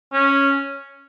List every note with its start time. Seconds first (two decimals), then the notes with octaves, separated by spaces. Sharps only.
0.13 C#4